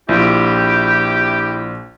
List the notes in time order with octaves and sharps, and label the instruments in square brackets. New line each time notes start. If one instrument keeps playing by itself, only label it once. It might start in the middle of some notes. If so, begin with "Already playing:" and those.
[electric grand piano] A#1 F4 [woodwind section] E4 G4